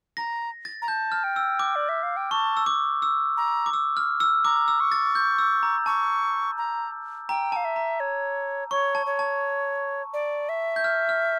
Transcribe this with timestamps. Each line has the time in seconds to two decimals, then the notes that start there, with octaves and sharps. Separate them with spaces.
0.17 A#5 A#6
0.65 A6
0.82 A#5
0.88 A5 G6
1.12 F6
1.24 G5
1.36 E6
1.59 D6
1.75 D5
1.89 E5
2.03 F5
2.17 G5
2.31 A5 C#6
2.57 E6
2.66 D6
3.02 E6
3.37 A#5
3.66 D6
3.73 E6
3.97 F6
4.20 E6
4.45 A#5 D6
4.68 E6
4.80 C#6
4.92 A6
5.15 G6
5.39 E6
5.63 A#5
5.86 A5 C#6
6.57 A#5
7.29 G5 A#5
7.52 F5 A5
7.65 E5
7.76 A#5
8.00 C#5
8.71 C#5 C#6
8.95 A5
9.06 C#5
9.19 A5
10.13 D5
10.49 E5
10.76 G6
10.84 F6
11.09 F6